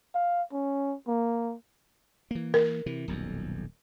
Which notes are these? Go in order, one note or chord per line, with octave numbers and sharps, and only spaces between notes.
F5
C#4
A#3
E3 A#3
A#4
C3 E3
D#1 B1 F2